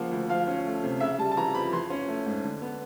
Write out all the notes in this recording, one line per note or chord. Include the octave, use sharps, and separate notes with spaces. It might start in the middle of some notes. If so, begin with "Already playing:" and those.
Already playing: C#3 F3 A#3 F#5
D2
F3 F5
C#4
A3
C3
C#3 E5
G3 A5
A5
E3 A#5
F2 B5
E3 C6
C#4
A3
G#2
D3
B3